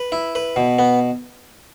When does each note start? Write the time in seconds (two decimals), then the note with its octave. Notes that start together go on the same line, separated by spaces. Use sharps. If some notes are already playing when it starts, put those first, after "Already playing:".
Already playing: B4
0.12 E4
0.35 B4
0.56 B2
0.79 B3